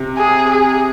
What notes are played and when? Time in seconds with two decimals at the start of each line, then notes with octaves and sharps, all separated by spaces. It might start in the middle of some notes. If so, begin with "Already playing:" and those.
Already playing: C3
0.17 G#4
0.50 G#4